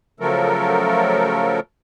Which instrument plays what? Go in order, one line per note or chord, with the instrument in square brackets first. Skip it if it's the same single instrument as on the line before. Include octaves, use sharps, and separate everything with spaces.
[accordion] C#3 F3 F#3 A3 A4 A#4